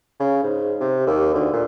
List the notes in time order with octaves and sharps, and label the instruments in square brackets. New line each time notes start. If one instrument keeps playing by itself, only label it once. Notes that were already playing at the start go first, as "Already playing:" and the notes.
[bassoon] C#3
G#2
C3
D#2
D2
A#2